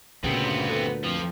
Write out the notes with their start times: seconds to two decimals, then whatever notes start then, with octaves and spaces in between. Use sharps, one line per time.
0.24 D2 G2 A#2 C#3 B3 C4
0.68 A4 B4 F#5
1.04 F2 F3